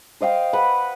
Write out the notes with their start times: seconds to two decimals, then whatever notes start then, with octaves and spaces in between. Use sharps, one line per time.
0.21 C5 D#5 F5 G5
0.53 B4 F#5